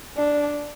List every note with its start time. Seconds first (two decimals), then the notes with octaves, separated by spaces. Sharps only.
0.17 D4